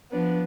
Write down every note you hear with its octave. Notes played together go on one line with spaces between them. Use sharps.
F3 B3 D4